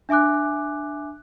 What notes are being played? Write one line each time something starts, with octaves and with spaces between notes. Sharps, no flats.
D4 E5 G#5 D6 F#6